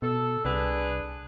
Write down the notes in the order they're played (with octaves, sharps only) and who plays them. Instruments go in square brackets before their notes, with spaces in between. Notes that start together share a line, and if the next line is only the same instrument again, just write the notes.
[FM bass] B2 [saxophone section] A4
[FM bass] C2 [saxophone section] D4 G#4 B4